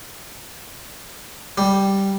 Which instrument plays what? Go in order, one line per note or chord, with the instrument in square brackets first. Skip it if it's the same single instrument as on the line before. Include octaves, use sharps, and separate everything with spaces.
[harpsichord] G3